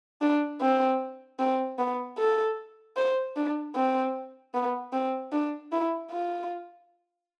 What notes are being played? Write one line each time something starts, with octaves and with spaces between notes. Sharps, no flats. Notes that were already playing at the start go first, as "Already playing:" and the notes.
D4
C4
C4
B3
A4
C5
D4
C4
B3
C4
D4
E4
F4